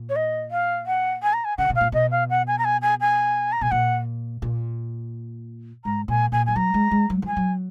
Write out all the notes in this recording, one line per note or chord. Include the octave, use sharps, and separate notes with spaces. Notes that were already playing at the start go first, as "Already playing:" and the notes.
Already playing: A#2
C#5
D#5
F5
F#5
G#5
A#5
G#5
C#3 F#5
B2
F5
A#2
B2 D#5
F5
F#5
G#5
A#5
G#5
G#5
G#5
A#5
B2 G#5
A#2 F#5
A#2
G#2 A#5
A#2 G#5
A#2 G#5
F3 G#5
F#3 A#5
G#3
G#3
F#3
F3 G#5
F#3